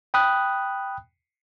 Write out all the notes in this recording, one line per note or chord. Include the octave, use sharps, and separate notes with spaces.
G5 B5 D#6 F#6